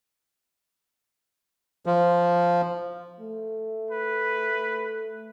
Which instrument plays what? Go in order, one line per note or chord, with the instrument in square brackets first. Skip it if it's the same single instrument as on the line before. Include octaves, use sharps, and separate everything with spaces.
[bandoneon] F3
[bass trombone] A3
[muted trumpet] B4